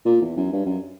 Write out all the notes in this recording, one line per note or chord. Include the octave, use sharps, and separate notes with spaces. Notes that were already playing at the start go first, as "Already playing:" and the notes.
A#2
E2
F#2
G2
F#2